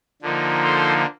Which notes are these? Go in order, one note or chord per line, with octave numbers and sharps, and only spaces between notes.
D3 F3 A#3 D#4
A4 C5